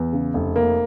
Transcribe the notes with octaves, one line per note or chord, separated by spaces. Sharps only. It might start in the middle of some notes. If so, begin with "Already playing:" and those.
Already playing: E2
C#3
F1
A#3